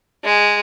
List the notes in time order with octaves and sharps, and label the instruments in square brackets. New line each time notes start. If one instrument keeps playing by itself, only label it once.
[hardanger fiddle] G#3